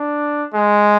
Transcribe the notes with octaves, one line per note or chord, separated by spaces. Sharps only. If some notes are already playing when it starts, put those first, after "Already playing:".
Already playing: D4
G#3